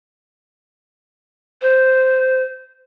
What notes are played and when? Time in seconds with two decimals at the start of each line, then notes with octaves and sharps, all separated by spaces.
1.62 C5